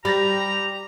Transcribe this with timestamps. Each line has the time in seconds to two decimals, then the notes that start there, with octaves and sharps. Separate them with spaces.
0.05 G3 G4 A#5 B5 A6 A#6